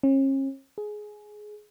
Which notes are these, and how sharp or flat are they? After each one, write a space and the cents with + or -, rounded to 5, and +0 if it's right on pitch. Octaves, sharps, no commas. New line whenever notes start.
C#4 -40
G#4 +15